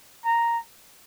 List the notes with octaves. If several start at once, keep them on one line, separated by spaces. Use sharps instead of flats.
A#5